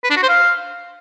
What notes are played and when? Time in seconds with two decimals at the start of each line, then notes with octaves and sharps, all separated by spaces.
0.04 B4
0.10 D4
0.17 F#4
0.23 C5
0.29 F5